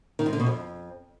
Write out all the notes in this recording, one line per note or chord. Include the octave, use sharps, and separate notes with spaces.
D#3
G#2
D3
B2
F2